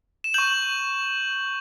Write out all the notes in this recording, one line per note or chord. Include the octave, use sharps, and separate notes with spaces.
E7
C#6 G6 F#7